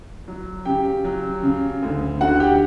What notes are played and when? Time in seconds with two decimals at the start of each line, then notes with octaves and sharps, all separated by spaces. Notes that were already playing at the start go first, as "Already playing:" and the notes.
0.28 F#3
0.65 C#3 G4 G5
1.04 F#3
1.43 C#3
1.83 D2
2.21 D3 F#4 F#5
2.40 G4 G5